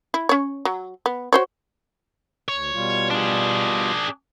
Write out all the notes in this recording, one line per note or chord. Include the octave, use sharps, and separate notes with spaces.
E4
C#4 C#5
F#3
B3
F#4 C5 C#5
D2 C#5
B2 G3 F4
D4 G#4